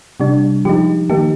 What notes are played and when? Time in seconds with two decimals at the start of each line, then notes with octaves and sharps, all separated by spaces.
0.20 C3 G3 D4
0.65 F3 G#3 D#4 G4
1.10 D#3 A#3 D#4 G4